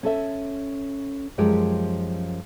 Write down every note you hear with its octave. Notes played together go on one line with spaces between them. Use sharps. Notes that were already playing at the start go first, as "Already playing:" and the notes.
C#4 A4 E5
F#2 F3 G#3 G4 A#4